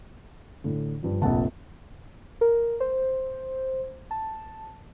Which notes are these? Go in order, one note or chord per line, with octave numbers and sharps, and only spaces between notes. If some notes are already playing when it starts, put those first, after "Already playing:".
A2 D3
G2 F3
F1 A#1 F#5 A5
A#4
C5
A5